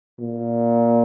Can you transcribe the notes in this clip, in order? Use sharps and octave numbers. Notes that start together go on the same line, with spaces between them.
A#2